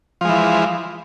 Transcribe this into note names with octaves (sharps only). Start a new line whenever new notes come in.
E3 F3 G#3